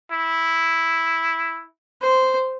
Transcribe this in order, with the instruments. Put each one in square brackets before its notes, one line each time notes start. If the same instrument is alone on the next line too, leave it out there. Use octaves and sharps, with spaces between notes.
[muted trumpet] E4
[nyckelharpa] C5